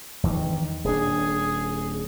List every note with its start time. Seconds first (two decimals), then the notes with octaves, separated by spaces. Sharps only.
0.23 E2 G2 D#3
0.84 D#1 D4 G#4